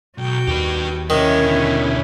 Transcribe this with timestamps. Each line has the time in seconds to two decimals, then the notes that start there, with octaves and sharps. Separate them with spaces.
0.18 B1 F#4 G5
0.48 D#2 G4 B4
1.10 C2 D#3 C#4 E4 E5
1.41 B2 D3